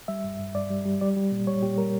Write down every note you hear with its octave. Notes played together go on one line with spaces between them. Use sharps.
G3 E5
G2
G2
G2 D5
G3
G3
G3 D5
G3
A#2
G3 C#5
A#2 G4
G3 A#4